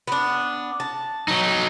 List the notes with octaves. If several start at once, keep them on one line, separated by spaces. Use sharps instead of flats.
B3 D4
A5
F#3 D#4